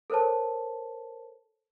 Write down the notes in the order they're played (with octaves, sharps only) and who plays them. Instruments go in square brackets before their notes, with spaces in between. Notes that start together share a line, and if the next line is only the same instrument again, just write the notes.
[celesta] A4 A#4 C5 C#5 A5